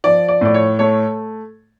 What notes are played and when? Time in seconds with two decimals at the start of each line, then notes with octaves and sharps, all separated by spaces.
0.04 F3 D5
0.28 D5
0.41 A2 D5
0.54 C#5
0.79 A3 C#5